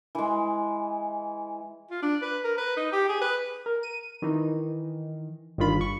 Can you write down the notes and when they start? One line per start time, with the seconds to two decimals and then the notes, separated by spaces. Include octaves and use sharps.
0.15 E3 G#3
1.91 F4
2.02 D4
2.22 B4
2.44 A#4
2.58 B4
2.77 D#4
2.92 G4
3.09 G#4
3.21 B4
3.66 A#4
3.83 D#7
4.22 D#3 E3 D#4
5.58 G1 G2 D#3 F4 B5
5.81 C#6